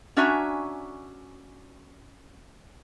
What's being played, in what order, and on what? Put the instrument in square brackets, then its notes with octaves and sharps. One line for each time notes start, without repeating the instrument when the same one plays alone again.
[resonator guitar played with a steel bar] C#4 D4 F#4 E5 G#5 A#5